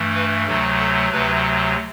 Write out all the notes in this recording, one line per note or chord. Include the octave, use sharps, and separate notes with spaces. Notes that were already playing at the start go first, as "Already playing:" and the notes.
Already playing: G2 E3 A3
B4
D2 C3 F#3 A3 A4
A4
D2 C3 F#3 B4